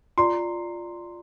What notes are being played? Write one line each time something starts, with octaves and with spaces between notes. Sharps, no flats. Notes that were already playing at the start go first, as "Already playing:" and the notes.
F4 D5 A#5 C6